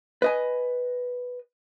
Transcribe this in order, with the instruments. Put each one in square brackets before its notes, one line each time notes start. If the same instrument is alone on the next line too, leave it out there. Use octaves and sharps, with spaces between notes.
[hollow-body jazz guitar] B4 D#5 G#5